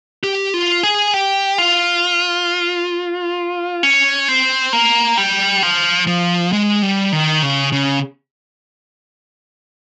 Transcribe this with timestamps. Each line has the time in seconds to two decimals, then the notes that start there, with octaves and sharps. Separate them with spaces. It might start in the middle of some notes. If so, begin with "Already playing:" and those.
0.24 G4
0.54 F4
0.83 G#4
1.14 G4
1.58 F4
3.83 C#4
4.28 C4
4.73 A#3
5.17 G3
5.63 F3
6.07 F3
6.52 G#3
6.82 G3
7.12 D#3
7.42 C#3
7.72 C#3